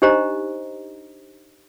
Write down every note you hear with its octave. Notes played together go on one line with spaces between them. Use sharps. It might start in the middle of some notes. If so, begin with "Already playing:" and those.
D4 D#4 G4 C5 D#5 A#5